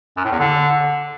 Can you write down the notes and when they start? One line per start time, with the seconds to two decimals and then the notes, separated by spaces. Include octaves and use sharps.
0.17 F#2
0.24 A2
0.32 E2
0.39 D3